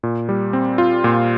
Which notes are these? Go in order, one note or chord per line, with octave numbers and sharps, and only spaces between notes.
A#2
G3
C4
F4
A#2